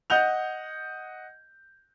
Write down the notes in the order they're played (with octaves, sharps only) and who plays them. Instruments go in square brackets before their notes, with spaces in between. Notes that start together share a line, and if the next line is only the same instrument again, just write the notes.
[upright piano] D#5 F#5 G6 F7